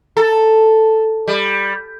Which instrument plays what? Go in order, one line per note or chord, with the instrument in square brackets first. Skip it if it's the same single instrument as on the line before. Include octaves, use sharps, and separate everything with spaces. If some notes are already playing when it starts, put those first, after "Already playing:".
[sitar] A4
G3